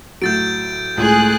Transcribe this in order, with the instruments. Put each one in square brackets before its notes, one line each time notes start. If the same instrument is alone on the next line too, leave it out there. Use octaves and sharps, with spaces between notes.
[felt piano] A2 F#3 [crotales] G6 A6 D7
[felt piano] C#2 [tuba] A2 [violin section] G#4 F#6